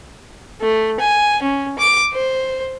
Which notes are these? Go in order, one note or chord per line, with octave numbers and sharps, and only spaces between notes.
A3
G#5
C#4
D6
C5